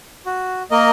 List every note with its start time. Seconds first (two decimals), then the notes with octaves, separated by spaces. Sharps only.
0.26 F#4
0.71 A#3 A#4 D#5